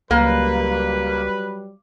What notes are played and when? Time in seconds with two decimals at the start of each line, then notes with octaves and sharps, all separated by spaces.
0.11 C#2 F#3 G3 A#3 B4